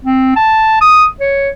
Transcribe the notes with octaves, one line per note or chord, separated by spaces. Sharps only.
C4
A5
D#6
C#5